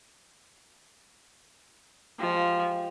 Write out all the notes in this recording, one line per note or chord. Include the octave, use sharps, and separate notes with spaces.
F3 G#3 F4 G4